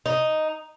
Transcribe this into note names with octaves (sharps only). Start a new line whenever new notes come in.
D#4